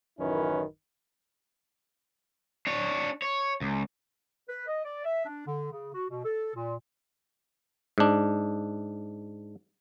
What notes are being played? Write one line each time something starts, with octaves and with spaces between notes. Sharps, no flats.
A1 F#2 D#3 C#4 E4 B4
D4 C#5
C#5
C#2
B4
D#5
D5
E5
D4
D3
C#3
F#4
B2
A4
A#2
G#2 D4